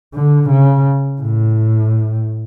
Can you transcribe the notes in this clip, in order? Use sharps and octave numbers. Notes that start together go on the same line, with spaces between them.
D3
C#3
A2